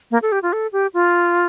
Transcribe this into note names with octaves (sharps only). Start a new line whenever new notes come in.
A#3
A4
G4
F4
A4
G4
F4